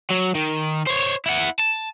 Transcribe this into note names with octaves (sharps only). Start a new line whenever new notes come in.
F#3
D#3
C5 C#5
E4 F#5
A5